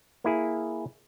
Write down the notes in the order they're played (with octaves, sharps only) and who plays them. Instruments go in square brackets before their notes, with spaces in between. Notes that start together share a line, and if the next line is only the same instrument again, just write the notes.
[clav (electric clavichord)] A#3 E4 G#4